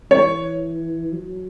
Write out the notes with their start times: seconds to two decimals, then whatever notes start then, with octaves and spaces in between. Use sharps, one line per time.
0.11 E3 C#5
1.13 F#3